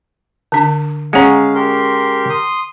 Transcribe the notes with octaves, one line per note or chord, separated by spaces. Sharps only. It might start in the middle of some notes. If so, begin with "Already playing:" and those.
D3 D4
G#3 C#4 F5 F#5 A#5
G4 A#4 C6
C6 D#6